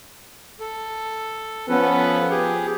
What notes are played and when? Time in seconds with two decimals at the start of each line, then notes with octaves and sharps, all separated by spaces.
0.60 A4
1.69 F3 B3 C#4 A4 B4
2.30 G4 G#4